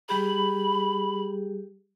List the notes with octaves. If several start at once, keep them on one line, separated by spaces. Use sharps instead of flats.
G3 G4 G#4 B5